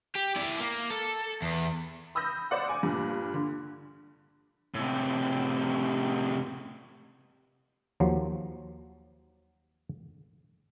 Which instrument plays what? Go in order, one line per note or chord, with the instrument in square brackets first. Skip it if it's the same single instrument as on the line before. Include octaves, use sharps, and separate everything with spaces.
[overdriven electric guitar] G4
E4 D5
A#3
A4
E2
[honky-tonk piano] B5 D#6 E6 G6 A#6
C5 D5 F#5
G#5 D6
G2 A#2
D3
[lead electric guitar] A2 C3
[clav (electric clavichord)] D#2 F3 F#3